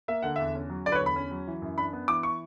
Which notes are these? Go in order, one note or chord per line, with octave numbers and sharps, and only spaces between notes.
A#3 E5
D3 F#5
E2 E5
C#4
F#3
D3 D5
B4
C#5
E2
B5
C#4
F#3
E3
F#2
D4 B5
B3
E3 D6
C#6